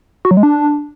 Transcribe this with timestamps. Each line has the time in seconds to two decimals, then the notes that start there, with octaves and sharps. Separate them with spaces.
0.25 F#4
0.31 F#3
0.37 G#3
0.43 D4